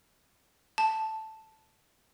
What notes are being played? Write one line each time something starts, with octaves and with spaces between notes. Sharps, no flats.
A5